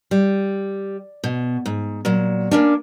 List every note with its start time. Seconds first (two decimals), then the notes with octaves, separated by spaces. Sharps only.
0.11 G3
1.24 B2
1.66 G#2
2.05 A#2 F#3
2.51 A#3 C#4 D4